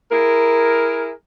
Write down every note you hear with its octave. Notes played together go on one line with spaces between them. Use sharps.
E4 G#4 A#4